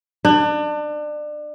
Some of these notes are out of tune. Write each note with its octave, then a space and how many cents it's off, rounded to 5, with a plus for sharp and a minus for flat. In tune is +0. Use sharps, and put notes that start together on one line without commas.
D4 +30